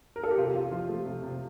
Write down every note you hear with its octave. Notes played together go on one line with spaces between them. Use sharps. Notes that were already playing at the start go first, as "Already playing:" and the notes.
A#4
A4
G4
C3 F4
C3 F4
F3 F4
A3
C3
C3